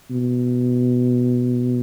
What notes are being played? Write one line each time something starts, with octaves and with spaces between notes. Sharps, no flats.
B2